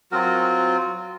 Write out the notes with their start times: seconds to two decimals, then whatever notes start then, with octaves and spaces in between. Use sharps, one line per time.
0.11 F#3 C4 F4 F#4 A#4